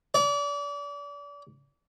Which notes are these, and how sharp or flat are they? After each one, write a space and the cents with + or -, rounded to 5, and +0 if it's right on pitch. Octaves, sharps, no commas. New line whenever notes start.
D5 -35